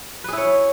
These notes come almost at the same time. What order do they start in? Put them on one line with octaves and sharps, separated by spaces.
B4 G#4 E4 C#5